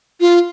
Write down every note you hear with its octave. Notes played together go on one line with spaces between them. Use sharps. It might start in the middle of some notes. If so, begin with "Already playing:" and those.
F4